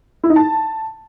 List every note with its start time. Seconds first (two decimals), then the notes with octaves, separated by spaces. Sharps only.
0.24 E4
0.30 D#4
0.36 A5